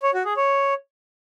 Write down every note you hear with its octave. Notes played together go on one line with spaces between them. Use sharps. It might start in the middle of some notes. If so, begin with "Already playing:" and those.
C#5
F#4
G#4
C#5